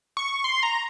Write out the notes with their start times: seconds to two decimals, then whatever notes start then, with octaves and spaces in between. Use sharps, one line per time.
0.17 C#6
0.44 C6
0.63 A#5